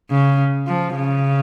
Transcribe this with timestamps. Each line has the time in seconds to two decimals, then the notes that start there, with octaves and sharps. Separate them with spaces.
0.11 C#3
0.67 F3
0.96 C#3